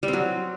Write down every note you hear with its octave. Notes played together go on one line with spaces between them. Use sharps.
G3
C4
F#3